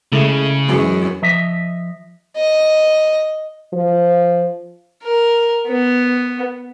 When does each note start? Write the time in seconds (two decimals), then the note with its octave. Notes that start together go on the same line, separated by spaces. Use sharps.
0.12 C#3 G#3 A3 E4
0.68 F#2 E3 F#3 G#3
1.22 F3 D#5 E5
2.37 D#5
3.73 F3
5.04 A#4
5.67 B3